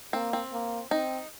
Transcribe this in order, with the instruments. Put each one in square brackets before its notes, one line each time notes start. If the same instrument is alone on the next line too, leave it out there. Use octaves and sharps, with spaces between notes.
[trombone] A#3 [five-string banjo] C4
[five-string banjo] C4
[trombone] A#3
[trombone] C4 [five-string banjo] D#4